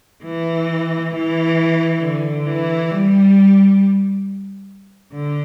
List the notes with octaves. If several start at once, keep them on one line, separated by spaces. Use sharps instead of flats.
E3
E3
D3
E3
G3
D3